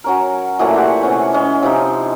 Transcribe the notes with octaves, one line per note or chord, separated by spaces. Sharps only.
F#3 C#4 A#4
A#2 E3 F#3 A3
G4 C5 E5 F#5
C3 C#4 F#5
G#3 C#4
C3 F3 D#4